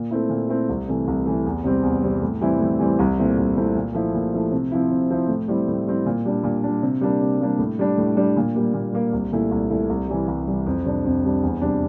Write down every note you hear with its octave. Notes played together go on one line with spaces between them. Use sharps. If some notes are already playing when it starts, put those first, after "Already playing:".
Already playing: A#2
A3 C4 E4
A#2
A3 C4 E4
C2
C3 E3 A3
C2
C3 E3 A3
E2
C3 G3 C4
E2
C3 G3 C4
A2
E3 G3 C4 E4
A2
E3 G3 C4 E4
C2
A#2 A3 C4 E4
C2
A#2 A3 C4 E4
A#2
F3 A3 E4
A#2
F3 A3 E4
C3
F3 C4 E4
C3
F3 C4 E4
A2
G3 C4 E4
A2
G3 C4 E4
A#2
G3 D4
A#2
G3 D4
C3
G3 A#3 D4
C3
G3 A#3 D4
A2
G3 D4
A2
G3 D4
A#2
G3 A#3
A#2
G3 A#3
C2
A#2 A3 E4
C2
A#2 A3 E4
C2
C3 E3 G3
C2
C3 E3 G3
F2
C3 G3 D4
F2
C3 G3 D4
E2
C3 G3 D4